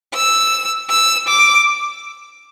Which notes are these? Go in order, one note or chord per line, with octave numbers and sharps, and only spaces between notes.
E6
E6
D6